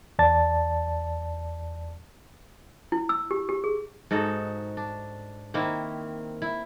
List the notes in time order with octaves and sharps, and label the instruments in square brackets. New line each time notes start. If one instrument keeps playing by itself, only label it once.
[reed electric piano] E2 D5 A5 A6
[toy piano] E4
E6
G4
G4
G#4
[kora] G#2 D#4 F#4 A4
D4
D#3 A#3 C4 E4
E4